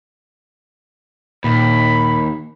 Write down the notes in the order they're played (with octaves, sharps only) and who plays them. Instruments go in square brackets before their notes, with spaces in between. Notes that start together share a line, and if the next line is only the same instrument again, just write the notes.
[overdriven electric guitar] D#2 [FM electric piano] A#2 [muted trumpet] B5